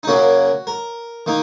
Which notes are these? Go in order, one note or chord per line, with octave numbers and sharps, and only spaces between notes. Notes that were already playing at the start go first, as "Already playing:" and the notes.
D#4
F#2 C#3 F#3 A#3 C#4 F#4
A#4
D#3 A#3 D#4